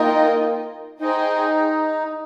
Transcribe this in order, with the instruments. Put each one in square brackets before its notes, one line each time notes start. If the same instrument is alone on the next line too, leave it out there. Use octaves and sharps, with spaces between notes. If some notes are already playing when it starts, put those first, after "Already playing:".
Already playing: [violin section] A#3 F4 A#4 D#5 G5 [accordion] D#4
[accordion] D#4 [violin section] G#4 C5 D#5 G5